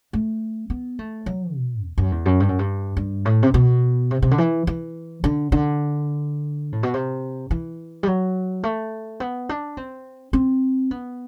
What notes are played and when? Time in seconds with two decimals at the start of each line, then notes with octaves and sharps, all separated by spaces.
0.13 A3
0.70 B3
0.99 A3
1.26 F#3
1.55 B2
1.83 E2
1.98 F#2
2.12 E2
2.26 F#2
2.40 G2
2.49 F#2
2.59 G2
2.97 G2
3.25 A2
3.43 C3
3.54 B2
4.11 C3
4.22 C3
4.31 D3
4.38 E3
4.67 E3
5.24 D3
5.52 D3
6.72 A2
6.83 B2
6.94 C3
7.51 E3
8.03 G3
8.07 F#3
8.63 A3
9.20 B3
9.49 D4
9.77 C4
10.33 C4
10.91 B3